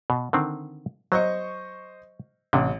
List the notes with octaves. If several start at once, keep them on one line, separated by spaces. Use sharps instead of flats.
B2
D3 D#3 C4
F#3 C5 D#5 C#6
A1 C3